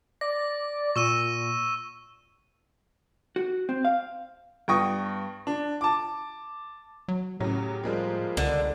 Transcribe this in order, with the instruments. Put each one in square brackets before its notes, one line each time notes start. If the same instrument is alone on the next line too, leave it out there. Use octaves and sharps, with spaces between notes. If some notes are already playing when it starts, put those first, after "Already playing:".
[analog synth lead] D5 [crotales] A#6
[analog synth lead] A#2 [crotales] C#6 E6 D#7
[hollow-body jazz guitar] F#4
C4
F5
[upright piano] G2 B3 G5 C#6 D#6 A#6
D4
A5 D6
[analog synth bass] F#3
[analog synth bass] A2 [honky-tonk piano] C#3 F#3 [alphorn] G4
[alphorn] F3 [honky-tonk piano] G3 G#3 A#3
[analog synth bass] C#2 [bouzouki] D3